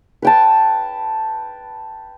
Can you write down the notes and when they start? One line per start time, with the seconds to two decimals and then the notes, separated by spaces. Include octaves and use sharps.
0.22 B4 G5 A5